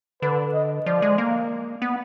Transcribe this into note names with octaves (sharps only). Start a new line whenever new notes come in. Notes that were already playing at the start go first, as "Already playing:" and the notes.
D3 B4
D#5
F3 D5
G#3
A#3
B3